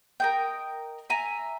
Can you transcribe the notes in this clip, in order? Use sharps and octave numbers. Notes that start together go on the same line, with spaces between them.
A#4 D#5 G5
E5 G#5 A#5